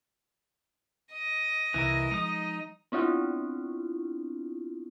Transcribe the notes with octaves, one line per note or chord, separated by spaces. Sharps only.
D#5
C2 E3 E4 A#4
F3 G#3 D#4 D#6
B3 C4 D4 E4 F4